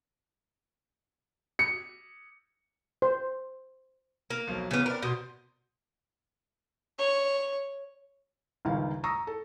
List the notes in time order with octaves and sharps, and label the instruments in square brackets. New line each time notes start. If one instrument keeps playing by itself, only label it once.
[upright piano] C#7
[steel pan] C5
[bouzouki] A#3
[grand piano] B1 F3 F#3
[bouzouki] C#3 B3 [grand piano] E3 C#4
[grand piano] B3 C4 D5 [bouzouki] A#4
[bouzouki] B2 [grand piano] C6 D#6 G6
[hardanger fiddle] C#5
[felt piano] G1 C#2 D#3 F5
A#5 C#6 D#6 E6 A#6
A4